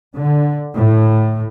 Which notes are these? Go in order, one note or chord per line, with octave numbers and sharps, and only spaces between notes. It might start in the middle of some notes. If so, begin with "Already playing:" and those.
D3
A2